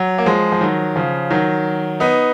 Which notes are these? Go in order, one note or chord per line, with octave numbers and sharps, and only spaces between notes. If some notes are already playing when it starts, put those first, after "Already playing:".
Already playing: F#3
A#3
F3 G#3
F3
D#3 F#3
C#3 F3
D#3 F#3
B3 D#4